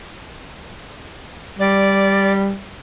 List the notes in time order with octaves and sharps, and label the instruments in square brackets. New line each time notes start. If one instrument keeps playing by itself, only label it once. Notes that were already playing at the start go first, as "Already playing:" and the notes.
[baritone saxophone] G3 [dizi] D5